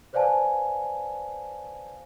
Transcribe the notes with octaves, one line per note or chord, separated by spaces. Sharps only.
B4 C5 D5 F5 G#5 A5